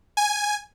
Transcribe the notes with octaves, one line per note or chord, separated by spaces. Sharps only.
G#5